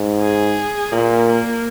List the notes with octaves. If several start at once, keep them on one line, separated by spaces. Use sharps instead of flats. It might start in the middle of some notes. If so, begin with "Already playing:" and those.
Already playing: G#2
G#4
A#2 A#3
A#3